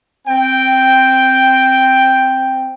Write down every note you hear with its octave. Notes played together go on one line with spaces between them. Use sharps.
C4 G5